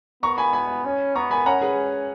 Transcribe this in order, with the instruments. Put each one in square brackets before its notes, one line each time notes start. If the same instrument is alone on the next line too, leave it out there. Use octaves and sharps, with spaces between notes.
[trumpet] B3 [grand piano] A#5 C#6
[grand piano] G#5 B5
G#5 B5
[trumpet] C#4
[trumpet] B3 [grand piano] A#5 C#6
[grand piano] G#5 B5
[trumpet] C#4 [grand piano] F#5 A#5
[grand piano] G#4 B4